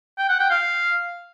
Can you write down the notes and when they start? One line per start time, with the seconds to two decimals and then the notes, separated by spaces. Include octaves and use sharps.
0.18 G5
0.29 F#5
0.40 G5
0.50 F5